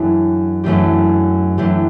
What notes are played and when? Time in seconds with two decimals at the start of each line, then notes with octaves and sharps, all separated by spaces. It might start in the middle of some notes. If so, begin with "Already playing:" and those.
Already playing: F#2 E3 A3 D4 G4
0.64 F#2 E3 A3 D4 G4
1.58 F#2 E3 A3 D4 G4